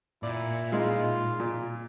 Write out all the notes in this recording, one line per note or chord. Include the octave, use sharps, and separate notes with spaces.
A#2 E4 D5
G#3 D#4 F4
A#2